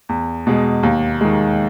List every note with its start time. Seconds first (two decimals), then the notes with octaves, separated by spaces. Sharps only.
0.09 E2
0.47 B2 G#3
0.83 D#2
1.21 D#3 G#3